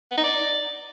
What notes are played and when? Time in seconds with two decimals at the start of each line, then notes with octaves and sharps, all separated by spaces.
0.11 B3
0.18 D#4
0.24 D5